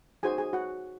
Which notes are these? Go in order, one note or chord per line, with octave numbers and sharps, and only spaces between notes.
D#4 F#4 G#4 C5 G#5
G#4 G#5
F#4 F#5